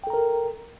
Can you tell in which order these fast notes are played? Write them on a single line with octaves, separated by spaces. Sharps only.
G5 A4 A#5 A#4